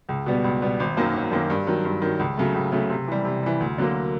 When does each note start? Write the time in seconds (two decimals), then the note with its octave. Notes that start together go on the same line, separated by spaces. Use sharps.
0.09 C#2
0.26 B2 G3 B3
0.44 C#2
0.62 B2 G3 B3
0.80 G#1
0.97 F#2 D#3 F#3 A#3
1.14 G#1
1.31 F#2 D#3 F#3 A#3
1.50 G2
1.67 D#3 F#3
1.85 G2
2.02 D#3 F#3
2.19 C#2
2.37 C#3 F#3 A3
2.55 C#2
2.72 C#3 F#3 A3
2.90 C3
3.08 E3 G3
3.25 C3
3.43 E3 G3
3.60 D2
3.78 D3 F#3 A#3